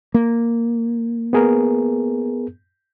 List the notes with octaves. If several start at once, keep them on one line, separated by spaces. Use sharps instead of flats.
A#3
B3 G#4 A#4